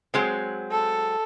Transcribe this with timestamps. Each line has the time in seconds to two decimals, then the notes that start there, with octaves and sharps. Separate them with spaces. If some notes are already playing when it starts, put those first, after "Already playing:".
0.14 F#3 G#3 C4
0.71 A4